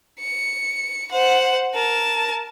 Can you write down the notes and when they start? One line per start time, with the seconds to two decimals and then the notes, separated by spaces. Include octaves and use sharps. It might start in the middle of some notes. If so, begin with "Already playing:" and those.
0.20 C#7
1.12 C5 F#5
1.75 A#4 A5